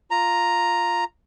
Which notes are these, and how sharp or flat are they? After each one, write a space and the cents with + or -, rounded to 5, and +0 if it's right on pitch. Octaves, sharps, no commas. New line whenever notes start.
F4 +0 A#5 +0